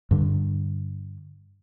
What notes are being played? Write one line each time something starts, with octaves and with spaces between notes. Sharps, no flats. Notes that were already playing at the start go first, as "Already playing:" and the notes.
G2 D3